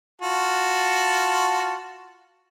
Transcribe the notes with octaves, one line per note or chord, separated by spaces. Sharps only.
F4 F#4 A5